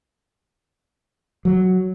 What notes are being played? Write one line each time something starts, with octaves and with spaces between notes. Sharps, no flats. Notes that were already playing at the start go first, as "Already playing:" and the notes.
F#3